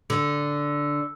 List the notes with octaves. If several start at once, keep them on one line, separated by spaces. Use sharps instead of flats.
D3